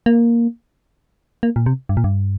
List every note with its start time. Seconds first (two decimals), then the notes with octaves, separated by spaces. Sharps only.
0.06 A#3
1.43 A#3
1.56 A#2
1.66 C3
1.89 G2
1.97 A#2
2.04 G2